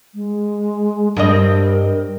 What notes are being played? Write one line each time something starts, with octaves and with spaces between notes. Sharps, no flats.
G#3
G2 C4 A#4 D#5